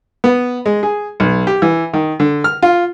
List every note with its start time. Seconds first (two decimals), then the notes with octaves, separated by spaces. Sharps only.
0.24 B3
0.66 G#3
0.83 G#4
1.20 B1
1.47 G4
1.62 E3
1.94 D#3
2.20 D3
2.44 F6
2.62 F4